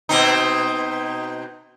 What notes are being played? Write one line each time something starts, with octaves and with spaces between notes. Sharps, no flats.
B2 C4 D#4